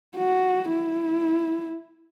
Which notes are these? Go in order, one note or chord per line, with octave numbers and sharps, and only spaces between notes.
F#4
E4